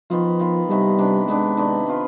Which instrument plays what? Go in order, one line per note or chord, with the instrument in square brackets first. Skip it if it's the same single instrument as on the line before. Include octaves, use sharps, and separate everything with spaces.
[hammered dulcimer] D#3 B3 F4 [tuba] F3
[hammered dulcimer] D#3 B3 F4
[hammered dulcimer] C3 D#3 B3 D4 [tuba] G3
[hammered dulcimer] C3 D#3 B3 D4
[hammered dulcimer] C3 D#3 B3 D4 [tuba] G#3
[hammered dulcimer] C3 D#3 B3 D4
B3 F4 B4